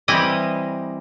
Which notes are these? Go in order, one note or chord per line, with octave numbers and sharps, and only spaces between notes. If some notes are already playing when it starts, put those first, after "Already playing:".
E3 G3 C4 E4 G4 D#5